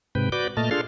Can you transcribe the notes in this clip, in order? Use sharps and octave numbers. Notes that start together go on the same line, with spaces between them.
G#2 C3 B4 G5
F#4 B4 D5 D6 G6
A#2 A3 D#5 A5 F6
D4 F4 G#4 A4 C6 F6